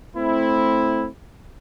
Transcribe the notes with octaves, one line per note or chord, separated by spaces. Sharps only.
A3 C4 E4